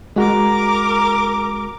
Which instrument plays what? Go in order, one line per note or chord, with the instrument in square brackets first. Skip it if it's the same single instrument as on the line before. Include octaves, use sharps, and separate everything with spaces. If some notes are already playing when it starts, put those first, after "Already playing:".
[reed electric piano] G#3 F#4 [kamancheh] A#4 D6